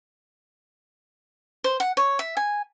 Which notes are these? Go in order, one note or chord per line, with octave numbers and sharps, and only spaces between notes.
C5
F#5
C#5
E5
G#5